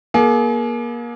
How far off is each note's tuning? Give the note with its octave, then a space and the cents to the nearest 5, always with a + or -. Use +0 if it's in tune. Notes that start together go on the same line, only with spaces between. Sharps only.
A#3 +30 G#4 +40